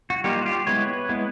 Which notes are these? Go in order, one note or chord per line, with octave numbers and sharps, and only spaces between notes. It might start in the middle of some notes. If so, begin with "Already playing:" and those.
F#4
G3 A#3 D#4 F4 G4
F#4
F4 G4
G#3 B3 E4 B4 C#5
G#3 B3 E4